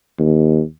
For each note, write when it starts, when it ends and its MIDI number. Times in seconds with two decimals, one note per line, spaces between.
0.20 0.62 39